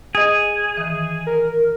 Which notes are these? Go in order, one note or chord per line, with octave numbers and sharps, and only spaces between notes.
G#4 D#5 D#6
D#3 E3
A#4